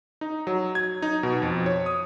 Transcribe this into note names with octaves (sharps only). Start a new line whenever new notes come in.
D#4
F#3
G#6
D#4
B2
F2
C#5
D#6